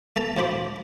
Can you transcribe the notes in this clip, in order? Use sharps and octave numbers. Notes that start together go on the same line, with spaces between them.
A3 A4 A5 A#5
D2 F3 C5 B5 D6